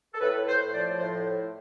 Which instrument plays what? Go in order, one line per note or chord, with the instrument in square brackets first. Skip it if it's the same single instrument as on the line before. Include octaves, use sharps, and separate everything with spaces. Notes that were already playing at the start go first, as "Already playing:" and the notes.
[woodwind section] A4
A2 B4
A2 C5
F3 D5
A2 C5